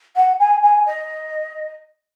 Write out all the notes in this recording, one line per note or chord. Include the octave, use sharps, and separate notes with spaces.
F#5
G#5
G#5
D#5